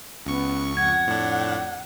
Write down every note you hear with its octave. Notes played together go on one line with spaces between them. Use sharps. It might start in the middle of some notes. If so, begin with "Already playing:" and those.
C#2 B3 C#4 C#6
F2 F#5 G#6
A2 D4